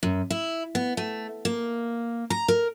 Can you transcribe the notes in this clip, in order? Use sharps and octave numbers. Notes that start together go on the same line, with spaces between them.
F#2
E4
B3
A3
A#3
A#5
A#4